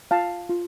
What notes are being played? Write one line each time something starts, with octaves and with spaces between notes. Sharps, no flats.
F4 F5 A5
F4